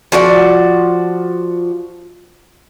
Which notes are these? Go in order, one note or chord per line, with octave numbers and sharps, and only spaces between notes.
F3 F#4 G#4 D5